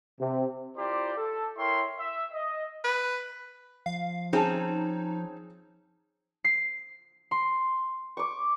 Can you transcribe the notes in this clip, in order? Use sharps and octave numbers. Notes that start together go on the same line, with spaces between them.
C3
E4 F4 G4 A#4 C5 D5
A4
E4 A#4 C#5 E5 G5 C6
E5
D#5
B4
F3 F5
C4 C#4 D#4 G#4 A5
C7
C6
C#6 D6